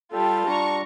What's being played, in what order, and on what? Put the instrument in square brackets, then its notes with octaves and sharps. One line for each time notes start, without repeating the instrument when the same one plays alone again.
[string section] G3 [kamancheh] F4 [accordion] A4 [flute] A5
[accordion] G3 D4 [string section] A#5 C#6